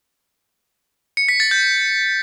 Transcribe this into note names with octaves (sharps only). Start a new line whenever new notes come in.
C#7
B6
A6
G6